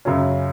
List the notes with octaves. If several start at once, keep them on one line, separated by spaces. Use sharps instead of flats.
F#2 C#3 F#3 C#4